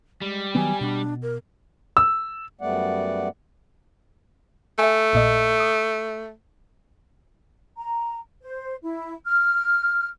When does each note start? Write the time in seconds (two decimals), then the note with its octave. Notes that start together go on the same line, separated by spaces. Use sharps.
0.21 G3 G#3
0.55 D#3 F#3 B3 G#5
0.81 B2 D4
1.22 A#4
1.97 E6
2.61 F#2 G3 A3 B3 D5 F#5
4.79 A3 E5 G#5
5.13 A#1 A#2 D#5
5.60 D#6
7.77 A#5
8.42 C5
8.83 E4
9.26 F6